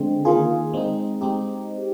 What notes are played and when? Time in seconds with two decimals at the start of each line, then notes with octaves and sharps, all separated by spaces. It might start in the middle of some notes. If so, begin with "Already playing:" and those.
Already playing: D3 G#3 C4
0.25 D#3 A#3 F4 G#4
0.73 G#3 C4 D#4
1.21 G#3 C4 D#4 G4